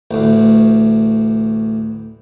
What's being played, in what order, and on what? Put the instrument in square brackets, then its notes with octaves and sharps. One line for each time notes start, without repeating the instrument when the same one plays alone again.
[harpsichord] A1 D2